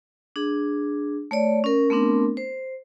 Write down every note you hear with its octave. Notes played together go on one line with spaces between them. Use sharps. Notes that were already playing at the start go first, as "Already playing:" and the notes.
D4 G#4
A3 C#5 D5
C#4 A#4
A3 B3 C4 D4 A#4
C5